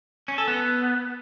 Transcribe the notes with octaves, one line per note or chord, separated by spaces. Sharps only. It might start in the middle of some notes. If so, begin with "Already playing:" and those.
C#4
A4
B3